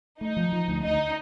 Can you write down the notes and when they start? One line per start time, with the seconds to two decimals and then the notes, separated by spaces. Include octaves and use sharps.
0.21 A3 D#4
0.37 F3
0.52 F3
0.68 D2
0.84 D2 D#4